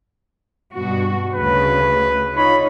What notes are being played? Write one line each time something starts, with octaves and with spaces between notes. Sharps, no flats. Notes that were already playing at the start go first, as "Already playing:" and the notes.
G2 B2 F#4
D2 C#3 B4
D#4 F4 C#5 B5